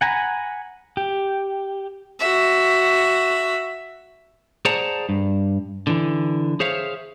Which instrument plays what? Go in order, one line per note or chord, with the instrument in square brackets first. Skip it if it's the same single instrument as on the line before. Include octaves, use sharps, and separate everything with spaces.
[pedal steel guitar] F#5 G#5 A#5 B5
G4
[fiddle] F#4 E5
[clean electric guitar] G#4 C5 D5 F#5 A5 A#5
G2
D3 E3
G#4 C5 C#5 E5 F5